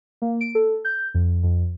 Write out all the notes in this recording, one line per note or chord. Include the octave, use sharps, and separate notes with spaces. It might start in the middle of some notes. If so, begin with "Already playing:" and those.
A#3
D7
A4
G6
F2
F2